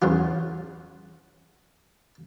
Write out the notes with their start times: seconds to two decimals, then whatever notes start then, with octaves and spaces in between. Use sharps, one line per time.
0.02 E2 C#3 F#3 F4